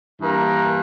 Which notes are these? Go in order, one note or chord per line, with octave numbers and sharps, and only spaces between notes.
G2 E3 A#3 A#4